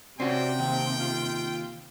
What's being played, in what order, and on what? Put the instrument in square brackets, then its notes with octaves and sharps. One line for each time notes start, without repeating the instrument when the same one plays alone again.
[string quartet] C3 [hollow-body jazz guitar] C4 C#4 F#4 [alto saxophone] D5 [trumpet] G5
[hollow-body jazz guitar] D#2 [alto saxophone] C4
[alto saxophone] F4